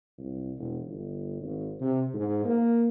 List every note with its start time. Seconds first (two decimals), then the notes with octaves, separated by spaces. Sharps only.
0.18 C2
0.58 E1
0.87 G1
1.41 G#1
1.80 C3
2.14 G#2
2.44 A#3